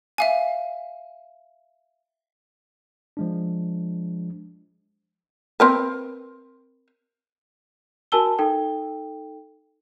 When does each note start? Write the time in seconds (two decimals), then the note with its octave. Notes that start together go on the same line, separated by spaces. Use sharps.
0.18 E5 F5 G#5
3.17 F3 G#3 D4
5.60 C4 A#4 B4
8.12 F#4 A#4 G#5 A5 E6 G7
8.39 D#4 A4 G5